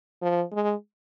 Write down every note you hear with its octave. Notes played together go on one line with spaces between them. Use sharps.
F3
G#3